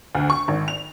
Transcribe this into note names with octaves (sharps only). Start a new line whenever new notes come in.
D2
C#6
G#1
F7